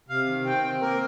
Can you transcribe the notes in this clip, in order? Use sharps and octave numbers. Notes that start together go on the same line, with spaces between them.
C3 F5
D#3
C4 G5
C4
A#3 A#4